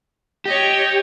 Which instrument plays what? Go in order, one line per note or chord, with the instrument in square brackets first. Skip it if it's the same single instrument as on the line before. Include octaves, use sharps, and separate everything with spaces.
[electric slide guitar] G4 [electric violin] C#5 D#5